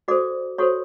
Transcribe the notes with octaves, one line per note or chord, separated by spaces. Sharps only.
F#4 A4 C5 D5 D6
F#4 A4 C5 C#5 C#6